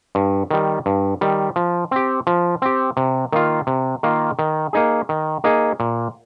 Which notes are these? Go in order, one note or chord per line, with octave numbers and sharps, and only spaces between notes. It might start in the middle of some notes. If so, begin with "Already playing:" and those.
G2
D#3 G3
G2
D#3 G3
F3
C4 G4
F3
C4 G4
C3
D#3 A#3 F4
C3
D#3 A#3 F4
D#3
A#3 D#4 G#4
D#3
A#3 D#4 G#4
A#2